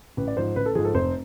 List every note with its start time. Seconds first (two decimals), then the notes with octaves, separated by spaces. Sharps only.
0.17 A1 B4
0.28 D5
0.37 G#2 F3 C5
0.56 A1 B4
0.66 A4
0.75 G#2 F3 G#4
0.85 A4
0.94 F1 C5